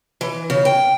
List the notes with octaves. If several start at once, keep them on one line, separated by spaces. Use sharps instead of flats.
E3
C#3
G5